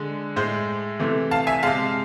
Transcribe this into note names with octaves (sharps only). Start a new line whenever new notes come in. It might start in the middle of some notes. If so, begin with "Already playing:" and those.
Already playing: D3 G#3
A2 G#3 C5
C3 E3 A3
F5 A5
E5 G#5
C3 G#3 F5 A5